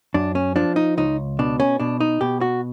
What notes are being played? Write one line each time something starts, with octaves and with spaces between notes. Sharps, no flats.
F#2 D4
C#4
F3 D4
D#4
C#2 D#4
B2 D4
C#4
B2 D4
D#4
B2 G4
F#4